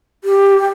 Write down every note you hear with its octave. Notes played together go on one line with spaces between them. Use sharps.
G4